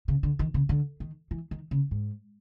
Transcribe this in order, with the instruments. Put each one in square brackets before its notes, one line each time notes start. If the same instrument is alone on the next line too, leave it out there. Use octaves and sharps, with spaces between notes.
[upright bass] C#3
D3
D#3
C#3
D3
D#3
E3
D#3
C#3
G#2